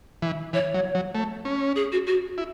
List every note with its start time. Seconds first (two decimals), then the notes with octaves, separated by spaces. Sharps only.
0.22 E3
0.53 E3 C#5
0.74 F#3
0.95 F#3
1.15 A3
1.45 C#4
1.76 G#4
1.92 F#4
2.07 F#4
2.38 E4